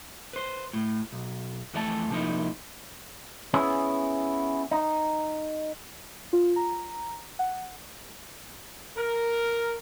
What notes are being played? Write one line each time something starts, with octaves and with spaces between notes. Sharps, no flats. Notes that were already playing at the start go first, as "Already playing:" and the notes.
B4 C5
A2
B1
F2 E3 A3 D5 A5
C3 F3 A#3 D#4 E4
B3 C#4 E4 G#4
D#4
F4
A#5
F#5
A#4